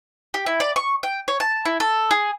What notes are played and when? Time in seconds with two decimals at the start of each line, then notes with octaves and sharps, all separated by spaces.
0.34 G4
0.46 E4
0.60 D5
0.76 C#6
1.03 G5
1.28 C#5
1.40 A5
1.65 E4
1.80 A4
2.11 G#4